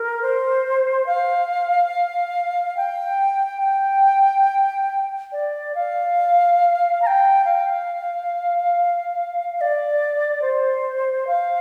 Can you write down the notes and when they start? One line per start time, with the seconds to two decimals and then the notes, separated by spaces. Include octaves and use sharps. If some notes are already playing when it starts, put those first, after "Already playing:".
Already playing: A#4
0.22 C5
1.06 F5
2.77 G5
3.62 G5
5.32 D5
5.75 F5
7.02 A#5
7.07 G5
7.45 F5
9.57 F5
9.61 D5
10.42 C5
11.27 F5